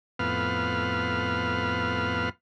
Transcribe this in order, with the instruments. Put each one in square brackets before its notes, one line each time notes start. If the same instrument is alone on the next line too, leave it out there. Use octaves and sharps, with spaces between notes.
[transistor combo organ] F2 A2 B3 B4 F5 F6